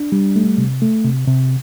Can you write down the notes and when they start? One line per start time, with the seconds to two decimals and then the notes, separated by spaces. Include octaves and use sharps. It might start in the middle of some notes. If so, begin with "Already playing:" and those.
Already playing: D4
0.12 G3
0.36 A3
0.58 C3
0.82 A3
1.04 C3
1.28 C3